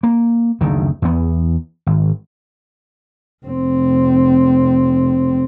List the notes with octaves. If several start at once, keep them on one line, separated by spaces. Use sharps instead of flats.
A#3
F#1 D2 D#3
E2 B3
G#1
F1 C4